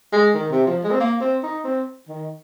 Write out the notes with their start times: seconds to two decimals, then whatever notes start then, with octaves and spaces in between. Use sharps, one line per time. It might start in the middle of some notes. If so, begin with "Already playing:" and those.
0.13 G#3
0.35 D#3
0.52 C3
0.67 F3
0.84 G#3
0.91 C4
1.00 A#3
1.21 C4
1.43 D#4
1.65 C4
2.09 D#3